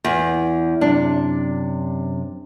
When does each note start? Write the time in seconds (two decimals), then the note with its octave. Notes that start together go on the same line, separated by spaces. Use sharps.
0.04 E2
0.81 F#2 C3 D4